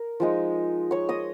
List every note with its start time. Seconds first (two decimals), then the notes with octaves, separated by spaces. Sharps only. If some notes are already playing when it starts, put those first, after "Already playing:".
Already playing: A#4
0.20 F3 G#3 D#4
0.91 C#5 C#6
1.09 D#5 D#6